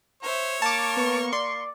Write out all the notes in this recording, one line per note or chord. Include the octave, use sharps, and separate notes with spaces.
C5 C#5 E5
A#3 A5 C#6 D6
B3
D5 C6